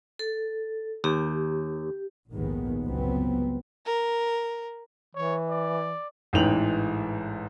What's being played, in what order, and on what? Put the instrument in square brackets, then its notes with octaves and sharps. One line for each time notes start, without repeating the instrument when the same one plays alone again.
[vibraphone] A4
[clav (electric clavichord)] D#2 [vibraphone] G4
[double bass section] A#1 D#2 G#2 D#3 G#3 B3
G1 C#2 F#3 B3 C4
[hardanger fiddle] A#4
[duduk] E3 [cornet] C#5
[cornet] D5
[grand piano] A1 G#2 E3 G5 F7 F#7